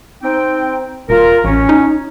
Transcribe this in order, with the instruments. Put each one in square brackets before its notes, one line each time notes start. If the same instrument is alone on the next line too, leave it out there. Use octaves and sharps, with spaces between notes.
[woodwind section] C4 D#4 G5
[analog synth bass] E1 [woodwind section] F4 A#4
[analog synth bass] A1 [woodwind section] C#4
[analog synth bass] D#4